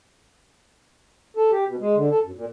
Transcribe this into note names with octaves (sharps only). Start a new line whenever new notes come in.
A4
G4
B2
G#3
D3
A4
F#2
A#2